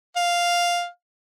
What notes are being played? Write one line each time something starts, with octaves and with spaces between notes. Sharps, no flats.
F5